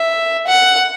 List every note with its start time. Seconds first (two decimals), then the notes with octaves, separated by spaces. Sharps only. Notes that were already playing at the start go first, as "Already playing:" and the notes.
Already playing: E5
0.47 F#5